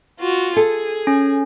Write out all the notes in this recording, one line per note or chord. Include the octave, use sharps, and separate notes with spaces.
F4 F#4
G#4 A4
C#4